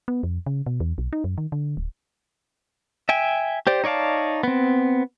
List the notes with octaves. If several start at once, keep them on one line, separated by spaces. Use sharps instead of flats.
B3
F2
C#3
B2
E2
B1
D#4
F#2
D#3
D3
D1
E5 G5 G#5
G4 C5 D5
D#4 C#5 D5 F5 A5
B3 C4